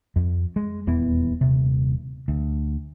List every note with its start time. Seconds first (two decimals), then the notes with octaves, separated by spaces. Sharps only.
0.16 F2
0.56 G#3
0.87 D#1 E2 E3 B3
1.41 D#1 C3
2.28 D2